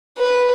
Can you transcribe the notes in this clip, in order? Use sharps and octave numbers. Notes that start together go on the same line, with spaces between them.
B4